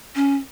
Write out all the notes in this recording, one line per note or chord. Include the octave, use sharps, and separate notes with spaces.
C#4